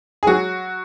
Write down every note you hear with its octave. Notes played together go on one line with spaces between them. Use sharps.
G#4
F#3 F#4